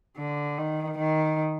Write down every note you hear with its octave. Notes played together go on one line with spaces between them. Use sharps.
D3
D#3
D#3